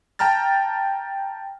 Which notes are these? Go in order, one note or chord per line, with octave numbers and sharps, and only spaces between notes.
G5 A5 A#5 F6 A6